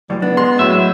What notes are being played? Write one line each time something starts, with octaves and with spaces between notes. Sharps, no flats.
C#2 F#2 A2 G3
B3 D4
G#3 C6
A2 F#3 E5